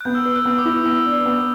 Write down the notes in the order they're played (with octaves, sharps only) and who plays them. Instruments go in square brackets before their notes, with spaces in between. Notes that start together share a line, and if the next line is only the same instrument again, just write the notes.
[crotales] F#6
[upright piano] B3 [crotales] G6
[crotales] E6
[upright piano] B4 [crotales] E6
[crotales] F#6
[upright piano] B3 [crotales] E6
[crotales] D6
[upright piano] E4
[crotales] E6
[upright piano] B3 [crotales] E6
[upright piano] D4
B3